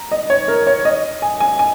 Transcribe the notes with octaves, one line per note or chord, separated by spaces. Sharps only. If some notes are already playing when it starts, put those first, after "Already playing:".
Already playing: A#5
D#5
C#5
A#4
C#5
D#5
G#5
G#5
G#5